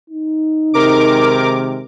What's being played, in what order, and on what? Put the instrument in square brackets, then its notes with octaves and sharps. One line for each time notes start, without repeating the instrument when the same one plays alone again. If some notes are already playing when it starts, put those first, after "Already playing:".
[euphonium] D#4
[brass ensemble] C3 D#3 G#3 [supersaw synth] A#4 D6